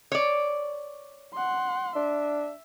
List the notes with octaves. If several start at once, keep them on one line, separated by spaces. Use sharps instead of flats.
C#5 D5
F#5 C6
D4 E5